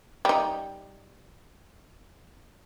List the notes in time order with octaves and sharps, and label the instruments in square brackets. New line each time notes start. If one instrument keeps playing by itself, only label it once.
[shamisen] G3 D#4